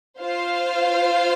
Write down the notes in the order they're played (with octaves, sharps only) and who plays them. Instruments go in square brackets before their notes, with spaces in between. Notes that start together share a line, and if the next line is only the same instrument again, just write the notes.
[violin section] F4 C5 F5